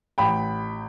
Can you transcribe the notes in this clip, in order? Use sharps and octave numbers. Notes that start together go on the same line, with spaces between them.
A1 G5 B5